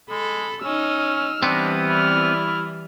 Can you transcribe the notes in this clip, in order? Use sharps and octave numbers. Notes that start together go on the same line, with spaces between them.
G#3 A4 B5
C#4 D#4 E6 F6
E3 G3 B3 C4 D4
E4 D5 F6